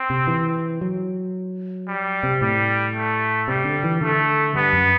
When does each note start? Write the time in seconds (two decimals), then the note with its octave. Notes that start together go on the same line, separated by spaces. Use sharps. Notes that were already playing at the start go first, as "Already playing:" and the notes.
Already playing: C4
0.10 C3
0.27 E3
0.81 F#3
1.87 G3
2.23 C3
2.41 A2 G3
2.95 A3
3.48 C3 G3
3.65 D3
3.84 E3
4.01 D3 A3
4.55 G2 B3
4.73 F#2